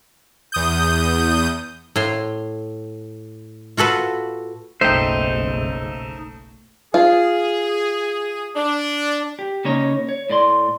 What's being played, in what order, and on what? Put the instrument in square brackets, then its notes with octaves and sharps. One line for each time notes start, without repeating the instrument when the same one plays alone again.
[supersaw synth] E2 D#6 G6
[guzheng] A2 C6
F4 F#4 A4 B4
[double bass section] F#1 B1 C#3 [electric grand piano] A3 [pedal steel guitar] D#4 E5 [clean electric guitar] C5 G5
[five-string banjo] F4 [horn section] G#4
[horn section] D4
[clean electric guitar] G4
C#3 A#3 C#4 D#4 C#5
C#5
A2 D5 C6